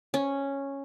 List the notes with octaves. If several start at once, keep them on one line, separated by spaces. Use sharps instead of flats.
C#4